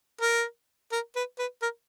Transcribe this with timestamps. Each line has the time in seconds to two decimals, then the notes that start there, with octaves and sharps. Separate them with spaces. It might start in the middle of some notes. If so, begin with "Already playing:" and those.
0.21 A#4
0.92 A#4
1.16 B4
1.39 B4
1.62 A#4